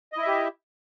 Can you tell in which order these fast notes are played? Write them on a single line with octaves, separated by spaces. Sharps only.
D#5 E4 E5 G4